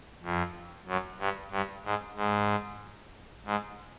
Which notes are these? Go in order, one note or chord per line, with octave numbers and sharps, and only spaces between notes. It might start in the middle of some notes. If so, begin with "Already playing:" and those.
F2
F#2
G2
G2
G#2
G#2
G#2